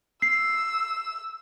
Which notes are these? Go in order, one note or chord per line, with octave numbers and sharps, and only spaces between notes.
E6 C7